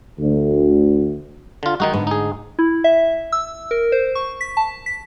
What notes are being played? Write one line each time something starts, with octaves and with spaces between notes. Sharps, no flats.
D2
D3 F4
D#3 G#3 D#4 F#4
G#2 D3 B3
D#4 G#4
E4
E5
E6
A#4
C5
C#6
B6
A5
B6